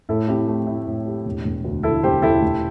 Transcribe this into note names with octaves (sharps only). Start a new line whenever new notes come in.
A2 E4 A4
C4 E4 G4
A3
E4
A2
G4
E1
E1
D2
D3 E4 A4
E1 G4 C5
E1 E4 A4
E1